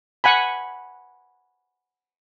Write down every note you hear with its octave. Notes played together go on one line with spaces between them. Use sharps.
F#5 G#5 B5